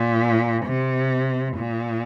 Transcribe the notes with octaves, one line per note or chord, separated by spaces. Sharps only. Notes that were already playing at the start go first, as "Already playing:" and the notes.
Already playing: A#2
C3
A#2